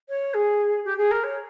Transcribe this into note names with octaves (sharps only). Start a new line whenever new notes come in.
C#5
G#4
G4
G#4
A#4
C#5